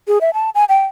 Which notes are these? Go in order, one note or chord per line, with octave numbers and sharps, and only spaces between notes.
G#4
E5
A5
G#5
G5